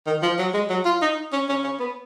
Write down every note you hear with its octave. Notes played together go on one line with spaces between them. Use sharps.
D#3
F3
F#3
G#3
F#3
F4
D#4
C#4
C#4
C#4
B3